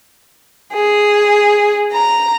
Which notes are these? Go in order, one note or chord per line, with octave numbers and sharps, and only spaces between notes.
G#4
A#5